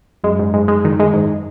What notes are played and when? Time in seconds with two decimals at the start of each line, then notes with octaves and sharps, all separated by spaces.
0.24 F#2 G#3
0.39 G#2
0.54 G#2
0.68 G#3
0.85 D#3
1.00 G#3
1.14 G#2